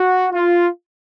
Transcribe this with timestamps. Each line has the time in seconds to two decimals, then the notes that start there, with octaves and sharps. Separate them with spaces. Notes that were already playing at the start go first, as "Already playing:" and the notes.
Already playing: F#4
0.32 F4